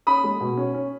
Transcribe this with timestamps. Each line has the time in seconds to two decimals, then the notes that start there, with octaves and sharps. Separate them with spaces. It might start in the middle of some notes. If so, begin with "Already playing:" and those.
0.07 C#4 B5 D#6
0.24 G#3
0.40 B2
0.57 C#4
0.75 C#4